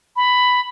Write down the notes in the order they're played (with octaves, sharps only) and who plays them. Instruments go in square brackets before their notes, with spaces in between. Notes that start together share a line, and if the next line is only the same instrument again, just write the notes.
[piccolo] B5